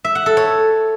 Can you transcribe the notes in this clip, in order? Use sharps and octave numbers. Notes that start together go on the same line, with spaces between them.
E5
F#5
A4
C#5